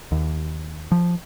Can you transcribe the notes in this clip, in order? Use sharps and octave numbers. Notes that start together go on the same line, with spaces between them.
D#2
F3